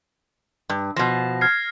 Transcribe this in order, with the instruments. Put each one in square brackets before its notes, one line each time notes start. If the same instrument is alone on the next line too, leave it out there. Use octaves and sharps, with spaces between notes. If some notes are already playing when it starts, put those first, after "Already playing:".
[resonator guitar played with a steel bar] G2
[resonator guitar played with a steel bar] B2 F3 [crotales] A#6
[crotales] F6 G#6 C7